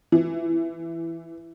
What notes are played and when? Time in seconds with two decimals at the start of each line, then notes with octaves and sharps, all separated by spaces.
0.12 E3